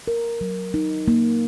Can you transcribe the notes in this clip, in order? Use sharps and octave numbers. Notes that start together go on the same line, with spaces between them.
A#4
F#3
D#4
A#3